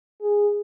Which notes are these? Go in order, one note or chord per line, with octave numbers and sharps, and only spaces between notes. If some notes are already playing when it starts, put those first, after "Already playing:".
G#4